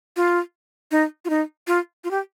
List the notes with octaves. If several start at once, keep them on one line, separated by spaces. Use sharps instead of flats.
F4
D#4
F4
D#4
F4
F4
G4